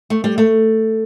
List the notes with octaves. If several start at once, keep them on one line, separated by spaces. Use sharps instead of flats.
A3
G3
A3